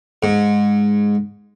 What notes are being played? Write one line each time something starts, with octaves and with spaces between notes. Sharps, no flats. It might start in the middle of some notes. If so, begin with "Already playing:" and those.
G#2